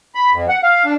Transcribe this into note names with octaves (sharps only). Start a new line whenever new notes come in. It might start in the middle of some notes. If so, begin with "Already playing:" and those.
B5
F2
F#5
F5
D4